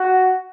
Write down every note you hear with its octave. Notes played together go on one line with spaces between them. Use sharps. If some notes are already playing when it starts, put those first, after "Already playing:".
Already playing: F#4